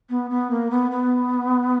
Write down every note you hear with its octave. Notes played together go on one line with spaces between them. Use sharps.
B3
B3
A#3
B3
B3